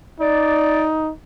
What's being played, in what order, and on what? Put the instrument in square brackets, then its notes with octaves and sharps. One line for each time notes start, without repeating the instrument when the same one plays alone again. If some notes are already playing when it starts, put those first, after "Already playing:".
[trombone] D#4 [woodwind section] D5